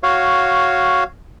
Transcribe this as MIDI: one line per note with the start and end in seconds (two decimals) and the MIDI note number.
0.03 1.04 66
0.03 1.04 73
0.03 1.04 77